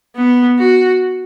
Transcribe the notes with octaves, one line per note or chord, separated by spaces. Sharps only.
B3
F#4